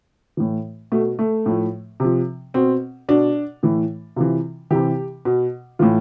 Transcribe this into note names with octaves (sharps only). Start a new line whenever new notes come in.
A2 E3
B2 A3
A3
A2 F3
C3 F3
B2 C4
B2 D4
A2 E3
C3 E3 F4
C3 E3 G4
B2
A2 E3 F4